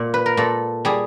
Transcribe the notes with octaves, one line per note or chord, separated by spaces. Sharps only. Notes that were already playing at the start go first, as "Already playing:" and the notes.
Already playing: A#2
B4
A#4
A#2 A4
G3 G#4